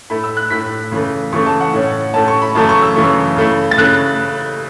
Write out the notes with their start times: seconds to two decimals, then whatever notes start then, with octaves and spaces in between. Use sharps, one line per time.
0.10 A2 A3 E4 B5
0.23 E6
0.37 F#6
0.50 A2 A3 E4 B6
0.92 C#3 E3 A3
1.33 C#3 E3 A3 C#6
1.46 A5
1.60 F#5
1.74 A2 A3 C#4
2.14 A2 A3 C#4 A5
2.28 C#6
2.42 B5
2.55 F#2 C#3 E3 A3 A5
2.69 C#6
2.82 E6
2.96 F#2 C#3 E3 A3
3.37 C#3 A3 E4
3.71 A6
3.78 C#3 A3 E4 F#6